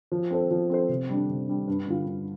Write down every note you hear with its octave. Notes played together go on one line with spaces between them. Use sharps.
F3
C4 A4 C5
F3
C4 A4 C5
C3
G3 D4
C3
G3 D4
G2
D3 G3 F4
G2